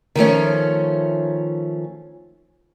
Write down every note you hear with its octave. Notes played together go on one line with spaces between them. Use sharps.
D#3 F3 A3 C#4